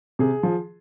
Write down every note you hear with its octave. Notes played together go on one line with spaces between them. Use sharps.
C3 G#4
F3